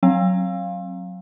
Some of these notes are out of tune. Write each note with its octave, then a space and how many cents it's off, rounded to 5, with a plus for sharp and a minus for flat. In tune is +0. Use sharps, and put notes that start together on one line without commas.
F#3 +0 C4 +35 F5 +0